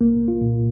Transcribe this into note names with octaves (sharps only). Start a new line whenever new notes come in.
C2 A#3
F4
A#2